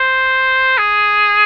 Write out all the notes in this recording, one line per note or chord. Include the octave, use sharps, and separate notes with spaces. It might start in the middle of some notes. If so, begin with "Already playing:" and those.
Already playing: C5
G#4